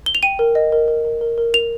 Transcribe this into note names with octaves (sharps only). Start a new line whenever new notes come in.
G7
F7
G5 D#7
A#4
D#5
A#4
A#4
A#4
A#4
A#4
A#4 F7